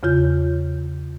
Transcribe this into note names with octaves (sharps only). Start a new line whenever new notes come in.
E2 C#3 F4 G6